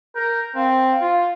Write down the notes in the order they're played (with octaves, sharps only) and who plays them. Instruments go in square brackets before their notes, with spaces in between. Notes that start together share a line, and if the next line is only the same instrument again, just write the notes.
[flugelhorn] A#4 [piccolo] G6
[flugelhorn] C4 [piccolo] F5
[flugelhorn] F4